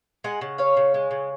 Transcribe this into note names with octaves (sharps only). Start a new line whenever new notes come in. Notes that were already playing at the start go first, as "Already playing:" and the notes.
G#3 D#5 F#5
C#3
C#4 C#5 F5
C#3
G#3
C#3